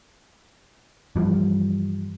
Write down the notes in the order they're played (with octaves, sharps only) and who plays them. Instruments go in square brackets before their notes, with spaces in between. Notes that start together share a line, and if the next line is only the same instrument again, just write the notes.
[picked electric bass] G2 E3 F3 G3